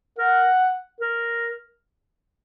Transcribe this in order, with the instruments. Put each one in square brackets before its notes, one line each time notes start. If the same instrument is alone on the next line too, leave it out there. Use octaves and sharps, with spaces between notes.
[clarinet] A#4 [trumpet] F#5
[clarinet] A#4